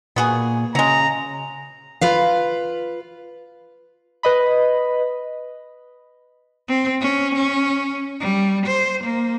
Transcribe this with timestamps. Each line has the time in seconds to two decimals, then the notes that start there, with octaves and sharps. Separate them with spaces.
0.16 A#2 B3 F#4 G#4
0.75 C#3 F#3 G#3 A#5
2.01 F4 B4 F5
4.23 B4 D#5 B5
6.68 C4
7.01 C#4
7.35 C#4
8.20 G3
8.66 C5
9.04 A#3